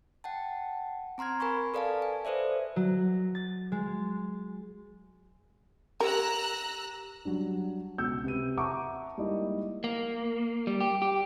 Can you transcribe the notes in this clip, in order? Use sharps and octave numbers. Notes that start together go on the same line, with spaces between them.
F#5 G5 A5
C4 A#5 C6 F6 G#6
A#4 G#5 B5 C#6
A4 B4 D5 F5 G#5 A5
G#5
A4 B4 C5 D5 E5
F#3
A6
G#3
G4 A#4 A#5 E6 F#6
F#3 G3 D4
C#2 B2 E6 G6 C#7
C3 B4 D#7
E5 F#5 A5 A#5 C#6 D6
G3 G#3 A#3 D#4 E4 D#5
A#3
G3
G4
G4